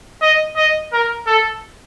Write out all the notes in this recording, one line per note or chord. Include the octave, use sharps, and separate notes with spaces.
D#5
D#5
A#4
A4